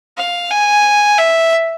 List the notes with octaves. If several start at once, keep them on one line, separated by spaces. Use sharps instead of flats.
F5
G#5
E5